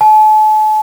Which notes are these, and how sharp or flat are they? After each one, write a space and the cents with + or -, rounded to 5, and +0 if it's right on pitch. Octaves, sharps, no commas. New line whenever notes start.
A5 -40